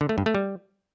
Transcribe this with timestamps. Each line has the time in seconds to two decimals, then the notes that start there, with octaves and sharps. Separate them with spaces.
0.01 D3
0.09 A3
0.18 G2
0.26 A3
0.35 G3